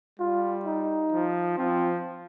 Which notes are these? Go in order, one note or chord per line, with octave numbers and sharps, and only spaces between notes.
G3 F4
D#4
F3
F3 C4